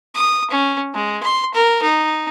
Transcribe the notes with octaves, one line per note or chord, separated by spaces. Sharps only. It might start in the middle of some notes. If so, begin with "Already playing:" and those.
D#6
C#4
G#3
C6
A#4
D#4